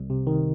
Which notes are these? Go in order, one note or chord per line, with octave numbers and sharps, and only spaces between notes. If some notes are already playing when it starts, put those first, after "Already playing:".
Already playing: C2
C3
D#3